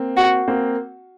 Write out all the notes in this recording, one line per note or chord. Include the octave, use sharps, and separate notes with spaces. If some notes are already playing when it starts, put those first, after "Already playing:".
Already playing: A#3 C4
F#4
A#3 C4